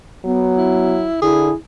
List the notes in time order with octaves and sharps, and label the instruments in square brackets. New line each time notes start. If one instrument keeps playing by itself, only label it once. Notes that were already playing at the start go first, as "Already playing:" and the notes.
[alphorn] F#3 [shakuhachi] B3
[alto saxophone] E4
[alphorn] D3 [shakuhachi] E4 [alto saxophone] G#4